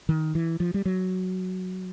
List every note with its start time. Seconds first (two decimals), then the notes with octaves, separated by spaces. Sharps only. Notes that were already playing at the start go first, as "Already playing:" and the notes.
0.09 D#3
0.35 E3
0.60 F3
0.74 G3
0.85 F#3